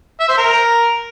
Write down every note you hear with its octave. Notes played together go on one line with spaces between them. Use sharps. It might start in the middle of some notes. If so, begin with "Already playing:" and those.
E5
C5
A#4